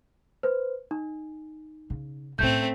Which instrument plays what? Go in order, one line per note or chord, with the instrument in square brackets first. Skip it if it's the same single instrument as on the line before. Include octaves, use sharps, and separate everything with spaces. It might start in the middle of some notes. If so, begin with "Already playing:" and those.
[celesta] B4 C5
D#4
[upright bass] C#3
[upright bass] A2 C#4 [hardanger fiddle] A3 C4 [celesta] G6